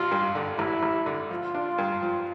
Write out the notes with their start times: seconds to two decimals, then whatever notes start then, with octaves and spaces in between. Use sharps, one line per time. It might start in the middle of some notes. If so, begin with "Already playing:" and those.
Already playing: A1 F4
0.11 G2
0.35 D3
0.59 A1 E4
0.83 A1
1.06 D3
1.30 F3 F4
1.55 D4
1.78 G2
2.02 F3